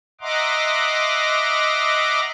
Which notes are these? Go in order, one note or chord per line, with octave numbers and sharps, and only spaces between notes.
D#5 E5 F#5 A#5 C6 D6